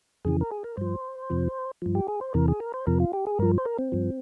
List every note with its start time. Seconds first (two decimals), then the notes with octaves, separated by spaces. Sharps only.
0.25 F2 C#3 E3 G#4
0.41 A#4
0.51 G#4
0.64 A#4
0.77 G2 F3 C5
1.30 F2 C3 F3
1.82 G2 F3
1.95 G4
2.08 G#4
2.21 C5
2.34 E2 C3 E3 A#4
2.48 G#4
2.60 A#4
2.74 C5
2.87 F2 C3 F3 A#4
3.00 F4
3.13 G4
3.27 G#4
3.39 G2 F3 A#4
3.58 C5
3.65 A#4
3.79 C4
3.92 G2 F3